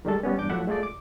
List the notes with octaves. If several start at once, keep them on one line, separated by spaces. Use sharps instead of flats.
D#3 G3 G#3 A4
G3 B3 C#4
E2 G2 D4 D6 G6
F3 F#3 A3 E4 E5 F#5
G#3 A3 F4 G#4 A4 D5
D6